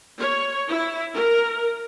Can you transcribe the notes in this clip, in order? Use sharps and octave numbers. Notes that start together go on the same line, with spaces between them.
C#5
E4
A#4